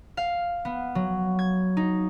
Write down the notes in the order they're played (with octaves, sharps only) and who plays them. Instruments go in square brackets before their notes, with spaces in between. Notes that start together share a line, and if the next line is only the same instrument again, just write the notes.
[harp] F5
B3
F#3
G#6
D#4